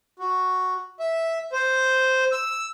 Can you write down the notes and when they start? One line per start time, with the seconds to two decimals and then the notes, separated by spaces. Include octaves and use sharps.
0.19 F#4
1.00 E5
1.52 C5
2.32 E6